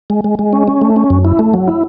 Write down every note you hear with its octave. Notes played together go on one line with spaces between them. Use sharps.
G#3
G#3
G#3
C#4
C#4
A3
C#4
F#2
E4
A3
F#3
E4